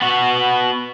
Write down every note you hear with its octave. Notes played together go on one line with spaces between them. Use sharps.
B3 F#4